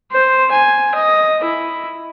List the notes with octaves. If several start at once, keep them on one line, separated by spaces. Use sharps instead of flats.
C5
G#5
D#5
E4